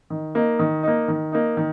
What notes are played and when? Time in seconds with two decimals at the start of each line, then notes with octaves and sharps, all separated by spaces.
0.10 D#3
0.35 A#3 D#4
0.59 D#3
0.83 A#3 D#4
1.08 D#3
1.32 A#3 D#4
1.57 D#3